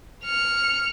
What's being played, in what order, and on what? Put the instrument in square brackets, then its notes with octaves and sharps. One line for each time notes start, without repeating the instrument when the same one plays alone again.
[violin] F6 C#7